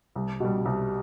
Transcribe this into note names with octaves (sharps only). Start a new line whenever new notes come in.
C2
B2 G3
C2